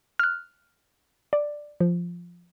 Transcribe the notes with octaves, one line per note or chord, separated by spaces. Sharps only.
F6 F#6
D5
F3